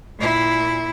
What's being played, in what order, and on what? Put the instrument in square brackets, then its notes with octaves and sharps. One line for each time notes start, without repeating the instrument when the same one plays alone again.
[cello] A#2 E4